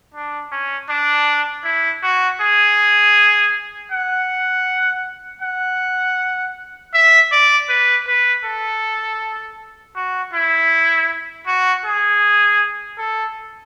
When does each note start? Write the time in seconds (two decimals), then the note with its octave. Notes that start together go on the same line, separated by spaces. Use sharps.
0.14 D4
0.52 C#4
0.89 D4
1.64 E4
2.03 F#4
2.41 G#4
3.92 F#5
5.42 F#5
6.94 E5
7.32 D5
7.69 B4
8.07 B4
8.45 A4
9.96 F#4
10.33 E4
11.47 F#4
11.85 G#4
12.98 A4